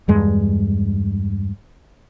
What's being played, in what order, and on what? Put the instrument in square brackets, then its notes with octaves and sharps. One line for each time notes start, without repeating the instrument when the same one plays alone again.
[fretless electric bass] E2 G2 G#3